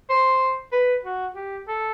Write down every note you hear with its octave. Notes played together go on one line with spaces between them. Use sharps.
C5
B4
F#4
G4
A4